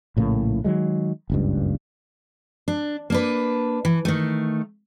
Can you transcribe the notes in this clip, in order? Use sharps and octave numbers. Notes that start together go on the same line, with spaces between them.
A#1 A2 C#3 A#3
D#3 F#3 G#3
F#1 C#2 G2
D4
A#3 D4 B4
E3
D#3 A3